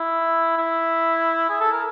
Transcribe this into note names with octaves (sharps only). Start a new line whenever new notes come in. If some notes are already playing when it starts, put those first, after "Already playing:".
Already playing: E4
E4
G#4
A4
A#4